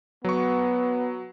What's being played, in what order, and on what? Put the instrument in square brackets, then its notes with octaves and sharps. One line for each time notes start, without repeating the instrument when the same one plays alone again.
[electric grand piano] F#3 C#6 [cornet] B3